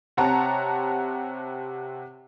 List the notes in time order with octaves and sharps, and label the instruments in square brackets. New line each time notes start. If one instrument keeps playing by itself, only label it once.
[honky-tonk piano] C3 C5 C#5 F#5 A5 A#5